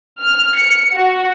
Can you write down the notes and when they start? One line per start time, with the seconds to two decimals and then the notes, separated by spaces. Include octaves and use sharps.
0.21 F6
0.57 C#7
0.94 F#4